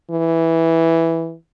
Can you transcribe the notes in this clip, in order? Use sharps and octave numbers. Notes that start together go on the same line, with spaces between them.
E3